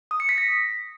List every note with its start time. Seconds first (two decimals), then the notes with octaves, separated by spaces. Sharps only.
0.11 D#6
0.20 C#7
0.29 B6
0.38 A#6